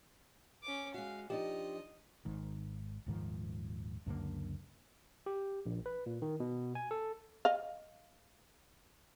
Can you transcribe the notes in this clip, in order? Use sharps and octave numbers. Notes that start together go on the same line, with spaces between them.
C#4 D6
G#3 F#4 F5
F3 D4 D#4 G4 D#5
G#1 G#2 D#3
D#1 G#2 D#3 F3
C#2 F#2 D3 A#3
G4
A#1
B4
A#2
D#3
B2
G#5
A4
D#5 F5